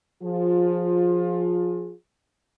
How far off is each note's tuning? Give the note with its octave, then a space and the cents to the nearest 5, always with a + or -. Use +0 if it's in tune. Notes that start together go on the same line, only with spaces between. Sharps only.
F3 +15 F4 +25 G#4 +0